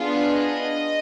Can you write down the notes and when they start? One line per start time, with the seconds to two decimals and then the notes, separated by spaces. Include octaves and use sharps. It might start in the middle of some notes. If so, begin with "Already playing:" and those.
Already playing: B3 D4 F4 G#4
0.32 D#5